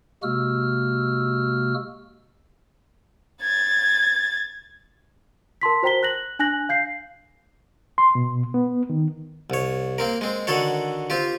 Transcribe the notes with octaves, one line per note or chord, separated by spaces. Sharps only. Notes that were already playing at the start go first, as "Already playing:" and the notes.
C3 G#3 A#3 F#4 E6 F6
G#6 A6
A#4 A5 C6 B6
F#4 C5 G5 A#5 B6 G7
F#6 A#6 F#7
D4 G#5 F#6 A#6 F#7
F5 G6 C7
C6
B2
B3
D#3
C2 C#5
A#3 C4 A#4
G#3 C4
D3 D#3 F#4 A4 C#5
C4 F4 G4